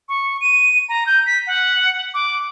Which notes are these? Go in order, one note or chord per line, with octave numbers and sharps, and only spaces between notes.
C#6
D#7
A#5
G6
B6
F#5
D6